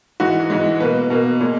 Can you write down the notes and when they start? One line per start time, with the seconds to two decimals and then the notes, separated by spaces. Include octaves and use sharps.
0.20 G#2 E3 G#3 F#4
0.50 G#2 E3 G#3
0.80 B2 A#3 B4
1.10 B2 A#3
1.41 A#2 G#3